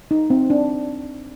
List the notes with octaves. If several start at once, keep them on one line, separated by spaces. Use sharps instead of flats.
D#4
C4
D4